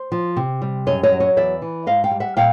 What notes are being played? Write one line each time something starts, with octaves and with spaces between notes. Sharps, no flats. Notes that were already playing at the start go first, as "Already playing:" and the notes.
Already playing: C5
F3
C3
G3
F#2 C#5 D#5
C#5 D#5
F#3
C#5 D#5
E2 D5 E5
E3
G#2 D#5 F5
F5 G5
G3
E5 F#5
A#2 F5 G5